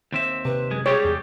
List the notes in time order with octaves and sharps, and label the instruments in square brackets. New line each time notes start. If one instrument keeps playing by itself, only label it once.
[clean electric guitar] D#2 C4 E5
[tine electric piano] C3 [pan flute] B4
[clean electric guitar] F#2 G#3
[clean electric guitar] G3 G#3 G4 [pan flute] G#4 [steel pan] C#5
[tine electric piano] E2